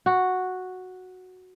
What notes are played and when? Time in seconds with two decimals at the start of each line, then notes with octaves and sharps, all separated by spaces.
0.06 F#4